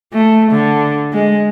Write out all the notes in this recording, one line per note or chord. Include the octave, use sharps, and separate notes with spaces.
A3
D3
G#3